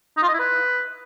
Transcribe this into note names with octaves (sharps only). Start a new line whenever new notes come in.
D#4
F4
D#5
E4
B4